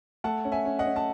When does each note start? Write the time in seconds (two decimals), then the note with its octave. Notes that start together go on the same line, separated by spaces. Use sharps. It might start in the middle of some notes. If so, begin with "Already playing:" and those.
0.24 A3 F#5 A5
0.45 C#4
0.52 E5 G#5
0.65 C#4
0.79 D#5 F#5
0.86 C#4
0.96 A5